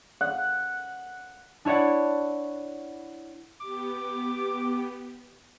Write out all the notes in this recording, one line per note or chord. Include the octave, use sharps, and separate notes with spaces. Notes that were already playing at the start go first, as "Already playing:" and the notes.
F#5
D4 E4 C#5 D5 F#5
B3 G4 D6